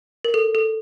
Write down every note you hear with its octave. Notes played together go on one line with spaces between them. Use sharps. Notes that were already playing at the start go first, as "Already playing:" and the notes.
A#4
A4
A4